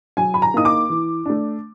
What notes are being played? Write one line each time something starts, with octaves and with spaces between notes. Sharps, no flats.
F#3 G#5
B5
A#5
A#3 D#4 D#6
D6
E3
A3 D4